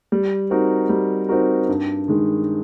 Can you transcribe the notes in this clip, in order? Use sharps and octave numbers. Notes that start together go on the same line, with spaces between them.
G3
C4 D#4 F#4 A#4
G3
C4 D#4 F#4 A#4
G2
D#3 G#3